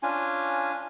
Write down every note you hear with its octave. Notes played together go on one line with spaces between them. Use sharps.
C#4 D4 F4 G#5